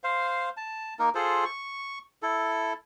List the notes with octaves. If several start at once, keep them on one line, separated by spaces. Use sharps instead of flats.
C5 F5
A5
A#3 D#4 A#4
F4 G#4 A4 C5
C#6
E4 A4